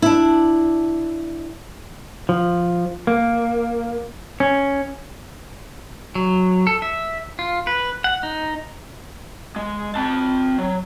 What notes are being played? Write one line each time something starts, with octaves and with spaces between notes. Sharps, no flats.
D4 E4
F3
A#3
C#4
F#3
A4
E5
F4
B4
F#5
D#4
G#3
C4 A5
F#3